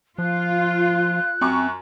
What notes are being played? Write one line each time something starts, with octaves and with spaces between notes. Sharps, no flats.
F3 F4 F#6
F#2 C4 C#6